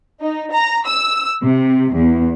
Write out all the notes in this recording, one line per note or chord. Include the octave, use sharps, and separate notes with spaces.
D#4
A#5
E6
C3
E2